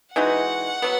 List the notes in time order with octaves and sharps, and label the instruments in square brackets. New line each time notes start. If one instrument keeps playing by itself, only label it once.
[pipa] E3 G#3 D#4 F#4 [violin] F#5
[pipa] F#3 B3